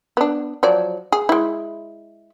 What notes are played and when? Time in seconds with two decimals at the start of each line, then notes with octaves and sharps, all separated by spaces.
0.17 B3 D4
0.63 F3 F#3 D5
1.12 G#4
1.29 G#3 E4